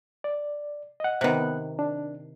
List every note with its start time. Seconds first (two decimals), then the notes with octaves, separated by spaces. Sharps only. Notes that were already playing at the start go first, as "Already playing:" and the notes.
0.24 D5
1.00 D#5 F#5
1.21 C3 D#3 B3 F#6
1.79 D4